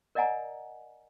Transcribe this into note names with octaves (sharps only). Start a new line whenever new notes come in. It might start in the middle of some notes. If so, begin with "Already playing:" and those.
A#4 D5 D#5 F#5 G#5 A#5